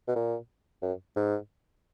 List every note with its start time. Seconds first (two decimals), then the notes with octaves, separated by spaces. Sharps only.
0.08 B2
0.16 A#2
0.82 F#2
1.16 G#2